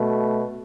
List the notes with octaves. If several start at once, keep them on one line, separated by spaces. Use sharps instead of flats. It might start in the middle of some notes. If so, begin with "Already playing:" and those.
Already playing: B2 A3